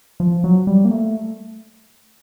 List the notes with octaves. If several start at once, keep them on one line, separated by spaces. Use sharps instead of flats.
F3
F#3
G3
A#3
A3